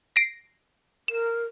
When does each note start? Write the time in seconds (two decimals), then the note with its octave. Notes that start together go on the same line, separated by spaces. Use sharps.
0.16 A#6 C7 D7
1.08 A#4 E7